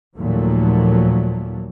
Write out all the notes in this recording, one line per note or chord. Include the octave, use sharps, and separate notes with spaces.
D#2 A#2 F3 F#3 A3